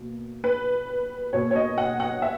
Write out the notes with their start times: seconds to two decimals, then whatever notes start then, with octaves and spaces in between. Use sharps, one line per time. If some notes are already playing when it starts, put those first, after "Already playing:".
Already playing: B2 A#3
0.44 B4
1.33 B2 A#3 C#5
1.51 C#5
1.56 D#5
1.78 F#5
2.00 F#5
2.22 E5